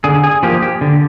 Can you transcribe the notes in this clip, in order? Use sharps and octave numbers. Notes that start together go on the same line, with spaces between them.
D3 G#4
G#4
F3 A#3 G4
G4
D3